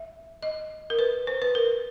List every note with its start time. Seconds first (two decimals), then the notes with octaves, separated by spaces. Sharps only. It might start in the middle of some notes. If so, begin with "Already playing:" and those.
Already playing: E5
0.43 D#5
0.90 A#4
0.99 B4
1.27 C5
1.42 B4
1.55 A#4